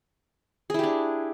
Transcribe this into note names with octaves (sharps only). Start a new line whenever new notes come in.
D4 E4 G4 G#4